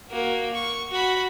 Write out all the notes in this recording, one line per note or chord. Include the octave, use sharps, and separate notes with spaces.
A#3 F#4
C#6
F#4 B5